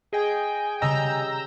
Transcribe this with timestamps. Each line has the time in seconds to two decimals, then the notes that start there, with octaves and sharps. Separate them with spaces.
0.13 G#4 D#5 G5 G#5
0.82 C#3 G3 C#4 D#5 A#5 E6 G6